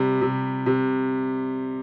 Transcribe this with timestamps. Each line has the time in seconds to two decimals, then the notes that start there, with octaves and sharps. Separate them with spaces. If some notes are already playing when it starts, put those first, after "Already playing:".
Already playing: C3 G3
0.21 C3
0.66 C3